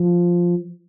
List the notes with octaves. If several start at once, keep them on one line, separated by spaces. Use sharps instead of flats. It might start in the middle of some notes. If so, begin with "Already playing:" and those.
Already playing: F3